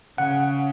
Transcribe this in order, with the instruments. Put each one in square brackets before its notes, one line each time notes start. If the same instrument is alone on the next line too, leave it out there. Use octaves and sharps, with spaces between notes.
[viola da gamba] C#3 [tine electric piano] F#5